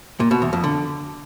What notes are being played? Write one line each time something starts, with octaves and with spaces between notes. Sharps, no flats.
A#2
B2
E2
F2
D3